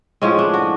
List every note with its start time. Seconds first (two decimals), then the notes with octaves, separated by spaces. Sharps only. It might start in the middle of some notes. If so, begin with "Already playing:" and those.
0.22 A2 F3 G#3 C#4
0.39 D4
0.54 F#4